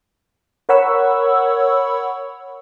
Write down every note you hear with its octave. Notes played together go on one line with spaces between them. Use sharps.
A#4 C#5 F#5 B5 C#6 E6